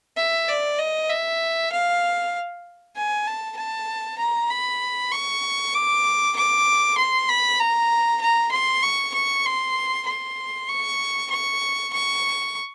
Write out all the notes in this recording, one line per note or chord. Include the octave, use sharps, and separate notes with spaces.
E5
D5
D#5
E5
F5
G#5
A5
A5
A#5
B5
C#6
D6
D6
C6
B5
A#5
A#5
C6
C#6
C#6
C6
C6
C#6
C#6
C#6